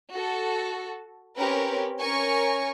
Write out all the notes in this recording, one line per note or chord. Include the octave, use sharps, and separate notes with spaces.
F#4 A4
C4 C#4 G4 A#4 B4
C#4 A#4 G#5 C#6